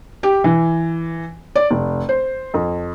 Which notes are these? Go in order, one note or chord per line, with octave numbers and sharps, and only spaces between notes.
G4
E3
D5
F1
C5
F2